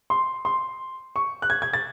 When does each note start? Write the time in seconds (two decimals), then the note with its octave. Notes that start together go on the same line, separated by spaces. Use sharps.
0.10 C6
0.45 C6
1.16 C#6
1.42 F#6
1.50 G#6
1.62 G#6
1.73 A6